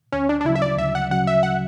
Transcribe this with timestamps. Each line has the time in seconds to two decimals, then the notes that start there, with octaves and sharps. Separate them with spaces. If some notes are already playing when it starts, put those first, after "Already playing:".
0.12 D2 C#4
0.29 D4
0.41 D4
0.45 C#3 F#3 E4
0.56 E5
0.62 D5
0.77 D2 E5
0.95 F#5
1.11 C#3 F#3 F#5
1.27 E5
1.43 F#5